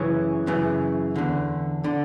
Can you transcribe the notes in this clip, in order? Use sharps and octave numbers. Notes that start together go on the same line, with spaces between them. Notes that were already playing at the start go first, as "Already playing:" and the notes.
Already playing: F#2 C#3 E3 C#4
F#2 C#3 E3
E2 D3
D3